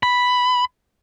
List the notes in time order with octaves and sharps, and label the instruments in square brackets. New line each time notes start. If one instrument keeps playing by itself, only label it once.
[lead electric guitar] B5